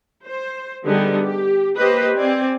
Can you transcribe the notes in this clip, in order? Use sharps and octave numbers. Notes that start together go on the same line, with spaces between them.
C5
D3 G3 B3 D#4 G4 G#4
G4
A#3 G4 B4 C5 D#5
C4 D5 G#5